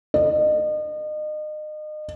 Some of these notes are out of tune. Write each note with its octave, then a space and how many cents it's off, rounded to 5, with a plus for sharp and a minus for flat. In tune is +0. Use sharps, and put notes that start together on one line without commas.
D#5 -35